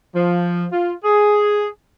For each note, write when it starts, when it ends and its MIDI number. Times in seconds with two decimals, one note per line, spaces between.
0.15 0.66 53
0.72 0.94 65
1.04 1.66 68